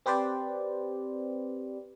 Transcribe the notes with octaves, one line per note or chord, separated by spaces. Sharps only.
C4 G4 B4 C5 D5